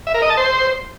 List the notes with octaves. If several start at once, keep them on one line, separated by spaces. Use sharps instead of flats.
E5
A#4
D#5
A5
C5